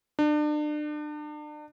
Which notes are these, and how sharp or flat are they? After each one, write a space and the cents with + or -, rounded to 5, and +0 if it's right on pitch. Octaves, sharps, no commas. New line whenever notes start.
D4 +35